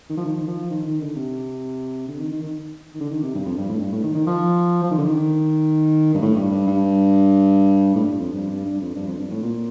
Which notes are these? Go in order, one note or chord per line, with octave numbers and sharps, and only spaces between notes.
D#3
F3
D#3
F3
D#3
D#3
D3
C3
D3
D#3
D#3
D#3
D#3
D3
D#3
C3
G2
F2
G2
A2
G2
A2
D#3
D#3
F3
F3
D#3
D3
D#3
G2
A2
G2
G2
G2
A2
G2
F2
G2
G2
G2
F2
G2
F2
G2
A2
A#2